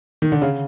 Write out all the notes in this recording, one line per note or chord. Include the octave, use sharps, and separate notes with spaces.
D#3
D3
C#3